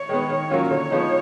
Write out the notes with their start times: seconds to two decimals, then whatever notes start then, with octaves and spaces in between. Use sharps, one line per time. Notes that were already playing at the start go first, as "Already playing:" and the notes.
Already playing: C#5
0.09 D#3 G#3 B3
0.29 D#3
0.50 F#3 A#3 C#4 F4
0.70 D3 C#5
0.91 F3 G#3 B3 D#4